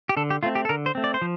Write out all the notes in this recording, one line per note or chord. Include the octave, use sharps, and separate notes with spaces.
G4
D3 A4
G4
A3 C4 F4
G4
A4
D3 A#4
C5
A3 C4
D5
C5
F3